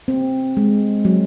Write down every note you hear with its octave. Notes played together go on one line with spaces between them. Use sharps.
C4
G#3
F#3